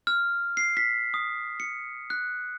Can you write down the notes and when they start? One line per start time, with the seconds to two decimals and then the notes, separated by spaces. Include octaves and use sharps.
0.07 F6
0.57 C7
0.77 B6
1.14 D#6
1.60 C#7
2.10 F#6